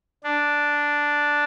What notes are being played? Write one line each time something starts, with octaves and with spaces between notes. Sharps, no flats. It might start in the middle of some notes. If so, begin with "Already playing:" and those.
D4